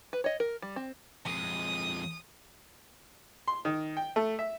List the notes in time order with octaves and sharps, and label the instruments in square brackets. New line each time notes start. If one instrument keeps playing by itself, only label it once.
[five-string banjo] B4
C#5 D#5
A#4
G3
C4
[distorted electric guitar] F2 G#3 [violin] D#6
[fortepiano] C6
D#3
G5
A3
E5